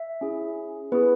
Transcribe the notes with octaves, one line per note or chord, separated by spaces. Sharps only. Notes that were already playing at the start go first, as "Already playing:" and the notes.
Already playing: E5
C#4 E4 G#4
B3 E4 G#4 B4